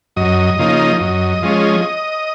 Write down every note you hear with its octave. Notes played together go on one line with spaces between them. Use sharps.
F#2 D#5
C#3 F3 A#3 D#4
F#2
F3 G#3 C#4